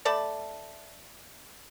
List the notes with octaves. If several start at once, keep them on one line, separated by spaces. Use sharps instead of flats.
A3 D5 A5 B5